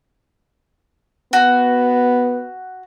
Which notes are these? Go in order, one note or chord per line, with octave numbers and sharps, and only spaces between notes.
B3 F#4